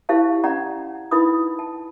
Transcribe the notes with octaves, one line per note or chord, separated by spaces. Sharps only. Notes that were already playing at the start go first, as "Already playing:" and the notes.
E4 G4 C5 F5 A5
C#4 D5 F#5 A#5
D#4 E4 B4 B5 D#6
A5